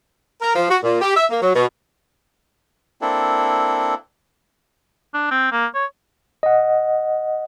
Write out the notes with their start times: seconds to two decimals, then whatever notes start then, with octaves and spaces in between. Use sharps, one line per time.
0.42 A#4
0.55 F3
0.70 F#4
0.83 A#2
1.01 G4
1.16 E5
1.30 A#3
1.41 F#3
1.55 B2
3.02 A#3 C4 D4 E4 A4
5.14 D4
5.31 C4
5.52 A#3
5.74 C#5
6.43 D#5 F#5